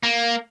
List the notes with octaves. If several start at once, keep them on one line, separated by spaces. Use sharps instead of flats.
A#3